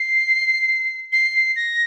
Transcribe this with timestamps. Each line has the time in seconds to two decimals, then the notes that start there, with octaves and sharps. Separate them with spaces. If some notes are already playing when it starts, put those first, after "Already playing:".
Already playing: C7
1.13 C7
1.56 A#6